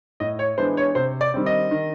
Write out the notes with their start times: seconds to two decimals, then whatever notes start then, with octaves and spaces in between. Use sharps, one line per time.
0.20 A2 D#5
0.39 C#5
0.58 E3 G#3 B3 D4 C5
0.77 C#5
0.95 C3 C5
1.21 D5
1.34 D#3 G3 C4
1.46 D#5
1.71 D#3